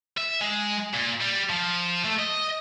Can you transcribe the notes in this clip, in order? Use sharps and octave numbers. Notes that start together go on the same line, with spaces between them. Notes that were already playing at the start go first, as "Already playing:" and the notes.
E5
G#3
A#2
G3
F3
A3
D#5